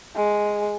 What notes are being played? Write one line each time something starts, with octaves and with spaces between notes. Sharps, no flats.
G#3